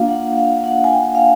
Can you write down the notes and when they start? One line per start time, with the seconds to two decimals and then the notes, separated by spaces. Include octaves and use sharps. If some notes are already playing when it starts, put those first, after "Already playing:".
Already playing: A#3 D4 F4 F5
0.08 F#5
0.37 F5
0.64 F#5
0.84 G#5
0.92 G5
1.15 F5